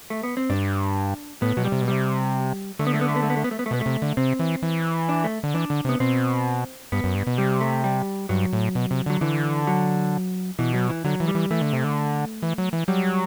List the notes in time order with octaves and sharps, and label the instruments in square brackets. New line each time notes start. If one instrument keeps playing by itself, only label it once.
[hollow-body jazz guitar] A3
B3
C4
[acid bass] G2 [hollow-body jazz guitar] D4
[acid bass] A2 [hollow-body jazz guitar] B3
[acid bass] B2 [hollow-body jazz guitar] F#3
[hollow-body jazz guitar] G3
[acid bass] C3
B2
[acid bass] C3 [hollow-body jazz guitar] G3
[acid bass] D3 [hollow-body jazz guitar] A3
[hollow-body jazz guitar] B3
A3
B3
A3
B3
A3
B3
A3
B3
A3
B3
A3
[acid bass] B2 [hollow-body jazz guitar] B3
[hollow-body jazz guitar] A3
[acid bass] C3
D3
[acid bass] C3 [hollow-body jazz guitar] C4
[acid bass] E3
E3
[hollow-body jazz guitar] D4
A3
[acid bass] D3
[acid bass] E3 [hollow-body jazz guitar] D4
[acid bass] D3
[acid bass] C3 [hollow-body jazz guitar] B3
[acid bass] B2 [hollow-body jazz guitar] C4
[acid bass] G2 [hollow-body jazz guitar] B3
[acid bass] F#2
G2
B2
[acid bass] C3 [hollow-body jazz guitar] G3
[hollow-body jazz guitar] A3
G3
[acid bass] G2 [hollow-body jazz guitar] F#3
[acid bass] A2
B2
C3
[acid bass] D3 [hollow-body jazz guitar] F#3
[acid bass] D3 [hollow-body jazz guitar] E3
[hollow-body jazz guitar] F#3
[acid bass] B2 [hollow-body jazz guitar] E3
[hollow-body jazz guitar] F#3
E3
[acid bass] D3 [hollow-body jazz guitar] F#3
[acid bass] E3
[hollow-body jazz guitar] G3
[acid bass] E3
[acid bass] E3 [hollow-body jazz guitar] A3
[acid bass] D3
C3
D3
E3
F#3
E3
[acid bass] F#3 [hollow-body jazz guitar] G3